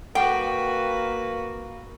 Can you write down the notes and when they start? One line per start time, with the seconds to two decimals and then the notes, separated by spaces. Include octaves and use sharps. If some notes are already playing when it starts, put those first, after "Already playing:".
0.15 A#3 F#4 A4 B4 F#5 G5 D6